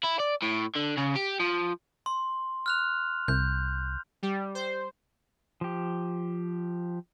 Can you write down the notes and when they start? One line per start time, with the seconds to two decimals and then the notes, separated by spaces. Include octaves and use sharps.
0.03 E4
0.19 D5
0.42 A2
0.75 D3
0.97 C#3
1.16 G4
1.40 F3
2.06 C6
2.66 F6 F#6 F7
3.28 C2 G6
4.23 G3
4.55 C5
5.61 F3 G4